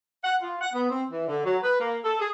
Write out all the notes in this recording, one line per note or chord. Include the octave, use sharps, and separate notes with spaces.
F#5
F4
F#5
B3
C4
E3
D3
F#3
B4
A#3
A4
G#4